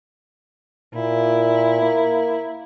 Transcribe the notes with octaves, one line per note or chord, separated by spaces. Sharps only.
A#2 E4
A#3